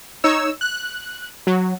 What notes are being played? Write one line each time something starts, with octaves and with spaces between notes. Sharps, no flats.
D#4 C#5 E6
F#6
F#3